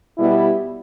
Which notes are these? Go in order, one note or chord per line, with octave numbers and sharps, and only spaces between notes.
B2 G3 B3 E4